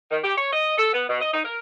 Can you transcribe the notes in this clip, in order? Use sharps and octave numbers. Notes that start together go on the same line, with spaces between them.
D#3
G4
C#5
D#5
A4
B3
B2
D#5
D#4
A#4